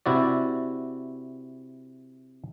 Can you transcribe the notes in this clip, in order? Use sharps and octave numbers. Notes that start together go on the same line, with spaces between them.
C3 E4 F#4 D5